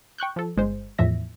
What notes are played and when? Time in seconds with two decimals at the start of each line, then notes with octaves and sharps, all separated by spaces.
0.18 G5 C#6 F#6 G6
0.36 F3 A4
0.56 G1 G#3 C5
0.98 E2 A2 F3 E5 A#6